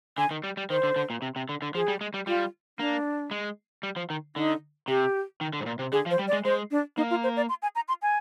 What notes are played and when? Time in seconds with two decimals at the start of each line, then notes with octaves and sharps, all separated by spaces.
0.18 D3 G#5
0.31 D#3
0.44 G3
0.57 G3
0.70 D#3 C5
0.83 D3
0.96 D3
1.10 A#2
1.22 C3
1.36 C3
1.49 D3
1.62 D3
1.75 F3 G#4
1.88 G3
2.01 G#3
2.14 G3
2.27 G3 F4
2.79 A#3 D4
3.31 G#3
3.83 G3
3.96 F3
4.10 D#3
4.36 D3 D#4
4.88 C3 G4
5.41 D#3
5.53 D3
5.61 G#2
5.66 A#2
5.79 C3
5.92 D3 G#4
6.06 F3
6.11 C5
6.19 G3
6.28 D5
6.33 G#3
6.45 G#3 C5
6.71 D4
6.97 A#3 D#4
7.11 F4
7.23 C5
7.37 D5
7.49 C6
7.62 G#5
7.75 A#5
7.88 C6
8.02 G#5